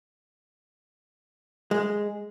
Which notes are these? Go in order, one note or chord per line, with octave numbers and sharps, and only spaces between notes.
G#3